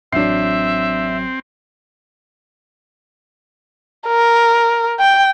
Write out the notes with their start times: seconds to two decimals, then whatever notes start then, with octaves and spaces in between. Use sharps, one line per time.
0.12 A1 F#3 C4 D4 E5 C7
4.07 A#4
5.00 G5